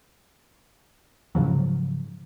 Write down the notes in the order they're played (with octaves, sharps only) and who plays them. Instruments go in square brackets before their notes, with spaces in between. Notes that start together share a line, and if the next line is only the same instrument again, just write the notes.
[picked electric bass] G#2 C#3 F3 F#3